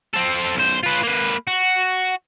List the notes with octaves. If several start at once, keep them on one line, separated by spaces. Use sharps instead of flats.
C4 A4
B1 C5
F4 B4
A#3 B4
F#4